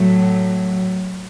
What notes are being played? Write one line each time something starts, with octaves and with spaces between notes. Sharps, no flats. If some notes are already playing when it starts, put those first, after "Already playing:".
Already playing: A2 F#3 A3